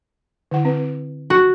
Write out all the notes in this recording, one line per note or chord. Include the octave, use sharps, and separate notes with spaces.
D3 E4 F#5
C4 B4
F#4